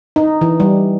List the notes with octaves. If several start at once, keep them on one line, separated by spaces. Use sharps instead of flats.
D#4
E3
G3